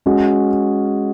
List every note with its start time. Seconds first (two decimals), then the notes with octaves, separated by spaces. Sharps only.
0.06 G#3 C#4 F#4